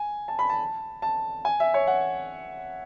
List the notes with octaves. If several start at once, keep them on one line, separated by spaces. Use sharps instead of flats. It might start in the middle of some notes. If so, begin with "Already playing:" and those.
Already playing: G#5
A5
B5
A5
A5
G#5
E5
C#5
F#5